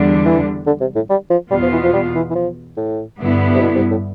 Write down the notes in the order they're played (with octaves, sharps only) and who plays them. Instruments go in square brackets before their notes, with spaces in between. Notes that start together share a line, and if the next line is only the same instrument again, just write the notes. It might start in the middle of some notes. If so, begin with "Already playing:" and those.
Already playing: [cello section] E2 D3 G3 D4
[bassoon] E3
D3
C3
A2
G3
F3
[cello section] E2 B2 B3 F4 [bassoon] G3
[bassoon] F3
E3
F3
G3
E3
E3
F3
A2
[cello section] G2 D3 G3 B3 E4
[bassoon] C3
B2
C3
A2